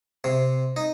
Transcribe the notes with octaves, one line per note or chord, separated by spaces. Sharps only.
C3
D#4